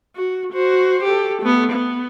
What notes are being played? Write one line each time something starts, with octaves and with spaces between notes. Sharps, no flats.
F#4
F#4 C5
G4 A4
A3 B3
B3